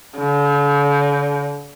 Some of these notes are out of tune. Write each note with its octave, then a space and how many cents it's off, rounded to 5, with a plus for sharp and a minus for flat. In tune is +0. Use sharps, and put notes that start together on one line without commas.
D3 -45